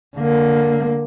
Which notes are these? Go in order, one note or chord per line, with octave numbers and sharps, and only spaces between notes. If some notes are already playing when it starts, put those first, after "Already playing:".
D3 A#3